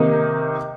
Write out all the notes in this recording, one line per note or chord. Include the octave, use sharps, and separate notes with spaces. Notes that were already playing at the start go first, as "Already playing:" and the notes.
Already playing: C3 D#3 A#3 D#4